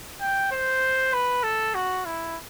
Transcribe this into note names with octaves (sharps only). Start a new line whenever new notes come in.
G5
C5
B4
A4
F#4
E4